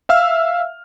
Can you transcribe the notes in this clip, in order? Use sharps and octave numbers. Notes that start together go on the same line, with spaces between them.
E5 F5 E6 F6